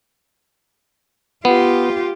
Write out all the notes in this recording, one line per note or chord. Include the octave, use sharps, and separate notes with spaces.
B3 F4 G4